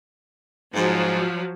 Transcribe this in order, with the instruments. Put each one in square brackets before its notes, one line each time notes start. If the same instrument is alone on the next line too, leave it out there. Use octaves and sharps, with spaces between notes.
[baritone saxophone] G#2 [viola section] F3 F#3